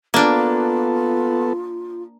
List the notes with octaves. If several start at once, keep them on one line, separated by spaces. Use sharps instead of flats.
A#3 B3 D4 F4 A4